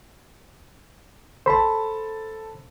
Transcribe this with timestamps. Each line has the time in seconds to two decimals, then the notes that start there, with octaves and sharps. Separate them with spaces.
1.46 A4 C5 A5 B5